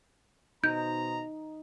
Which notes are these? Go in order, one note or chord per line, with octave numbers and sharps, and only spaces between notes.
B2 D#4 C5 A#5 G6